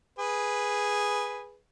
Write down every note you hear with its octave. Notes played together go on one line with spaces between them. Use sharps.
G#4 B4